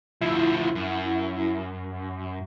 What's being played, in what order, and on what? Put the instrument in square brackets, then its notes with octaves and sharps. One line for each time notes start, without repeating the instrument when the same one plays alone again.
[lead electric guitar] D2 F3 [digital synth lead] E4
[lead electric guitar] F#2